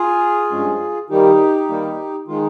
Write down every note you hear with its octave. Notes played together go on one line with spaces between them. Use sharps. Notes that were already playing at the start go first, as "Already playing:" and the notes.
Already playing: F4 G#4
G2 F3 G#3 C#4
D#3 G3 A#3 D#4 G4
D#3 G3 A#3
D#3 G#3 D#4 F4